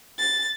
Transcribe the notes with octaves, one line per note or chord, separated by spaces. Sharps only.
A6